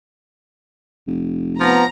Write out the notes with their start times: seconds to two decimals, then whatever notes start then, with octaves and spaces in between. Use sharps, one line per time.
1.07 F1
1.60 F3 B3 A#5